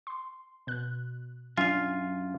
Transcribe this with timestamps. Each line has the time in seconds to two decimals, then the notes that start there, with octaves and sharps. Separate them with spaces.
0.07 C6
0.67 B2 F#6
1.58 F#2 D4 F4 F5 G#5